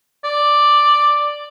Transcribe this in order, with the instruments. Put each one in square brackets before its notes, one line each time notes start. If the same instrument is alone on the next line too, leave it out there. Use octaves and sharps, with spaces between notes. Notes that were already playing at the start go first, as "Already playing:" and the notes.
[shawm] D5